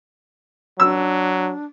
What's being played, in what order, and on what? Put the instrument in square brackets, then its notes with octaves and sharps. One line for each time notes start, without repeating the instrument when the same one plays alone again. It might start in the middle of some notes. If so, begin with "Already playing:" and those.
[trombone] F#3 [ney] D4 [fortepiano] E6